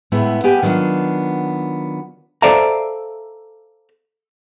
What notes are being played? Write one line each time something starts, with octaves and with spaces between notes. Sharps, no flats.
A2 G#3 B3 E4
B3 G4 G5 G#5
D#3 F#3 B3 D4 F4
A4 C5 D5 E5 F5 A#5